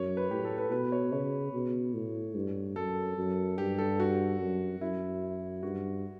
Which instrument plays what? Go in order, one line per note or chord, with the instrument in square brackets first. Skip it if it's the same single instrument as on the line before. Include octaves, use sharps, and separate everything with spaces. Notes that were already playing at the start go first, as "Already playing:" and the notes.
Already playing: [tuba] F#2 [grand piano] C#5
[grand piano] B4
[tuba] A2 [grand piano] G4
[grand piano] A4
B4
[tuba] B2 [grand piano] B4
[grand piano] C#5
[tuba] C#3 [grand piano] C#5
[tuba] B2
A2
G2
[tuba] F#2 [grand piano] A4
[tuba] F#2
[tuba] G2 [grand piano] G4
[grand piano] A4
F#4
[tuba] F#2
[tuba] F#2 [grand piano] E4
[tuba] G2 [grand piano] F#4